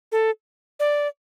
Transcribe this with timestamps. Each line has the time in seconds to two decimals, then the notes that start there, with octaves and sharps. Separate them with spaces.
0.12 A4
0.80 D5